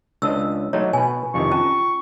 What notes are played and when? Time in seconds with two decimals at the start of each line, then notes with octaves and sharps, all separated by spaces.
0.22 C#2 D4 D#5 E6
0.73 F#3 A3 D#4 C#5
0.93 B2 B4 G#5
1.34 F2 C3 D#3 C#6
1.52 C#4 F4 A5